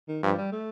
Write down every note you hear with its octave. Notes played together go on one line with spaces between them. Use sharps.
D#3
G2 F3
G3
A3